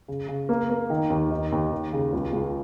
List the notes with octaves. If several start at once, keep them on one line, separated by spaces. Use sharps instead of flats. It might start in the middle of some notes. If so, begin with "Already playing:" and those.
C#3
C#3
A#3
A#3
D#3
D#2
D#4
D#2
D#2
C#3
C#2
C#2